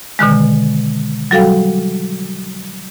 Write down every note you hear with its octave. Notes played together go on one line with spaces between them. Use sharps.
B2 D3 D#3 G#3
F#3 G3 F#4 A4 F5 G5